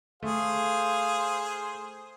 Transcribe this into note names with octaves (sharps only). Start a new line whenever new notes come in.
A3 G#4 C5 F5